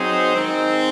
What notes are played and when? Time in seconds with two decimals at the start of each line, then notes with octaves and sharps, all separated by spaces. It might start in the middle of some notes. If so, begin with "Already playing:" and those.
Already playing: F#3 C4 D#4 G#4 C5
0.33 D#3 G#3 C4 D#4